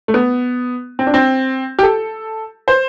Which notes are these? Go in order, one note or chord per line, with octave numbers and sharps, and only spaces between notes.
A3
B3
C4
D4
C4
G4
A4
C5